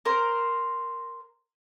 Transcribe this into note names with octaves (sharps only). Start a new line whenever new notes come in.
A#4 C5